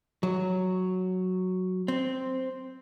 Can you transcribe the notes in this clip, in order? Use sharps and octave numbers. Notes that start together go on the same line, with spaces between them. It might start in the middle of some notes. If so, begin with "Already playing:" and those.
F#3
C4